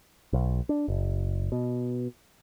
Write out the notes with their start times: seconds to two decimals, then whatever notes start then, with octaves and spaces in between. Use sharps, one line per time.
0.33 B1
0.69 D4
0.88 F#1
1.52 B2